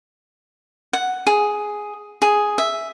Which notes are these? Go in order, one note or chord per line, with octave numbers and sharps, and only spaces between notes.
F#5
G#4
G#4
E5